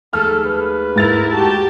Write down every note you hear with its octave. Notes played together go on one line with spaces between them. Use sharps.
D#2 G#3 A3 A4 F6
B4
G#2 E4 A#4 A6 F7
F#4 G4 A5